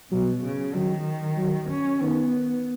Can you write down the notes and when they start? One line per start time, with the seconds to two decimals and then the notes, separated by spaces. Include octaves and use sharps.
0.11 B2 F#3
0.43 C#3
0.74 D#3 F#3
1.37 F#3
1.70 C#4
2.01 D#3 B3